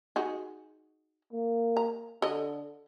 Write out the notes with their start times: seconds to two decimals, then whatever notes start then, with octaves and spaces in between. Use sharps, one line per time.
0.16 D#4 F#4 G#4
1.32 A#3
1.77 A#5
2.22 D3 A4 D#5